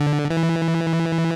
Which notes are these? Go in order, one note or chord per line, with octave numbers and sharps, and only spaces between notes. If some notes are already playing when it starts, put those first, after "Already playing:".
Already playing: D3
E3